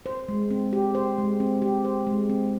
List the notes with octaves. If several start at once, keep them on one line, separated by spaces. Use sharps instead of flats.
C5
G#3
C4
G4
C5
G#3
C4
G4
C5
G#3
C4